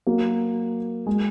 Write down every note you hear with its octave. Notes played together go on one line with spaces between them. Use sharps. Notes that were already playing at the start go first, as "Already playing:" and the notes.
F#3 A#3
G#3